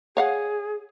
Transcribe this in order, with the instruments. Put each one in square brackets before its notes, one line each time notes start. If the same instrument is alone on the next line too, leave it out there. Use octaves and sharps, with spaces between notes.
[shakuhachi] G#4 [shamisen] C#5 F5 F#5